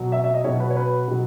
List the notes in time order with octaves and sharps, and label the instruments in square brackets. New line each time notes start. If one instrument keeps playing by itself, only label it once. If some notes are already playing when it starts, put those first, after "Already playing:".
Already playing: [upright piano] B2 F#3
E5
E5
D#5
B2 F#3 C#5
B4
C#5
B4
B2 F#3